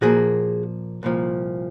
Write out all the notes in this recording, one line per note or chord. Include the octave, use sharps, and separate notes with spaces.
A#2 F3 A#3 F#4 G#4
C2 A#2 F3